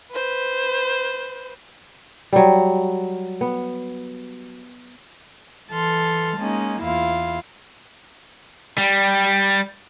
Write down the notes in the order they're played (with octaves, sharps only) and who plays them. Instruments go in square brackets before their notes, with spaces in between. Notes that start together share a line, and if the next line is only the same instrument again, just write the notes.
[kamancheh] B4 C5
[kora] F#3 G3
B3
[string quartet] E3 A4 A5 C6 F6
G#3 A#3 C#4 D#4
E2 E4 F4 F5
[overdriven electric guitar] G3